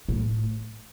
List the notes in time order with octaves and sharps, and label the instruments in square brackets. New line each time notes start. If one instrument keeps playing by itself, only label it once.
[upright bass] A2